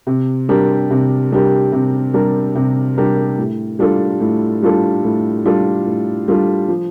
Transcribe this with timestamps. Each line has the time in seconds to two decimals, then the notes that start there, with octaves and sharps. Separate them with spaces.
0.07 C3
0.49 G3 D4 G4 A#4
0.91 C3
1.32 G3 D4 G4 A#4
1.72 C3
2.14 G3 D4 G4 A#4
2.55 C3
2.97 G3 D4 G4 A#4
3.38 A2
3.79 G3 D4 F4 A4
4.20 A2
4.63 G3 D4 F4 A4
5.04 A2
5.45 G3 D4 F4 A4
5.86 A2
6.28 G3 D4 F4 A4
6.69 F3